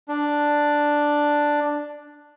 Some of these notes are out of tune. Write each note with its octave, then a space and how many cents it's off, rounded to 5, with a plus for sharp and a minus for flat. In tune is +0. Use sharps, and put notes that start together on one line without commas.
D4 +5